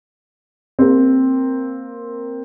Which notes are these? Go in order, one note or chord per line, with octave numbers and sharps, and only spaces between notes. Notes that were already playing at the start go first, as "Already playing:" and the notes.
A#3 C4